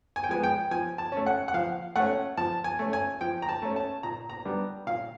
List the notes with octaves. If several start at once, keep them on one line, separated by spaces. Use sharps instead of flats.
G#5
G5
F3 G#3 B3 G#5
G5
F3 G#5
A5
A3 C#4
F#5
F#5
F3 F5
A3 C#4 F#5
F3 A5
G#5
A3 C#4
G#5
F3 G5
A#5
A5
A3 C#4
A5
A#2 A#5
A#5
G3 B3 D4
A#2 F5